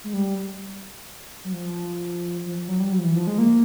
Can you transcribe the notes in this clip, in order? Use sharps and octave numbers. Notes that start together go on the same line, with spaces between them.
G#3
G3
F#3
F3
F3
F3
F#3
G3
F#3
F3
E3
F3
G#3
A#3